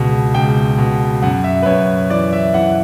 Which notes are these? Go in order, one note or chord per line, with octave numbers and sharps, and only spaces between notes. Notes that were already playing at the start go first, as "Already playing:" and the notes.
Already playing: C#2 B2
C#2 G5
B2
F#2 F#5
E5
B4
F#2 C#5
E3 D5
E5
E3 F#5